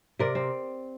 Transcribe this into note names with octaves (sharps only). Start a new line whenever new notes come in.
C3 A#4 D5
C4